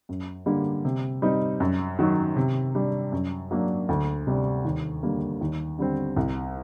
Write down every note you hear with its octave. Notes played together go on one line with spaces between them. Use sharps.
F#2
D3 G3 A#3
C3
G3 C4 D#4
F#2
D#3 F#3
C3
G3 D4
F#2
F#3 A#3 D4
D2
C3 G3 D4
D#2
D3 G3 A#3
D#2
D3 G3 C4
C2